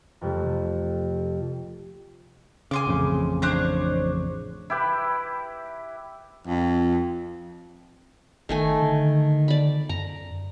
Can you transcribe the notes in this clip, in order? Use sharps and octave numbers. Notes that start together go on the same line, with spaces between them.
F2 C3 G3 A3
C#3 G#5 C6 D6
A1 F2 C#3
D4 C5 C#5
E4 G4 B4
F2
G1 D#3 A3 G#5
D3
D5 B5
F#2 A#5